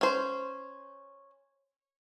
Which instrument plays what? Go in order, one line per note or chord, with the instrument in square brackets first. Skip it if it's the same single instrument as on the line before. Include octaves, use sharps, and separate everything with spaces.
[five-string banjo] C#4 C5